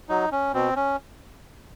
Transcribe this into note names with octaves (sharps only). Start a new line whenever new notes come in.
F#3 D#4
C#4
B2 C4
C#4